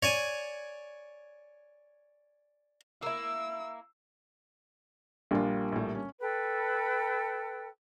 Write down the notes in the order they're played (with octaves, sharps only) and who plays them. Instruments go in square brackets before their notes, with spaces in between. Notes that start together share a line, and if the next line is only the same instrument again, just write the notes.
[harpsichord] C#5 D5 G#5
[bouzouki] A#3 E4 [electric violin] E6
[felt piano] A#1 F4 [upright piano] G3 A#3 D4
[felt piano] A#1 A2
C#4
[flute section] A4 B4 G5